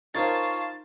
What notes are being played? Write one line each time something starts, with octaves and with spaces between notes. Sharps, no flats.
D#4 F4 A#4 C5 C#5 A5 A6